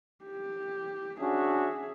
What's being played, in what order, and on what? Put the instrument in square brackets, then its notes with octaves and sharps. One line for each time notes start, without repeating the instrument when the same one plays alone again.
[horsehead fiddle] G4
[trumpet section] C#4 D4 F#4 [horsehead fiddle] G#4 E5